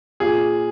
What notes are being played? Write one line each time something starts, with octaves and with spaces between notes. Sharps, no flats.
A#2 G#4